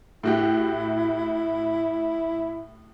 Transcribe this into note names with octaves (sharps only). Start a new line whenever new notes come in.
A2 E4 F#4 G4